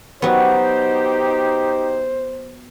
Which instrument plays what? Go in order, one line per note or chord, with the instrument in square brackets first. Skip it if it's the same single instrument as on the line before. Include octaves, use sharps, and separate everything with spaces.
[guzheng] F#3 B3 [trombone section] D#4 G4 [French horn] C5